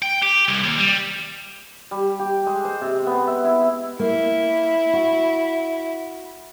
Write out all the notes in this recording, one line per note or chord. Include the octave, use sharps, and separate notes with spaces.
G5
G4
C2
D#2
G3
G3
G4
G#3
C5
C3
B3
E5
E4
A#3 E4
F#4